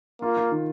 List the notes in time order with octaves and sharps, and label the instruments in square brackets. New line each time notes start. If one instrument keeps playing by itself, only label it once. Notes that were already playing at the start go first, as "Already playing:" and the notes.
[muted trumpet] A#3 [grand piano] F4
[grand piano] F4
D#3